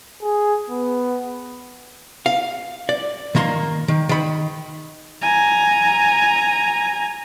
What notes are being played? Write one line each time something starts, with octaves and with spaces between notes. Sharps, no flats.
G#4
B3
F5
D5
D#3 A#3 A#5 C6
D#3
D#3 B5
G#5 A#5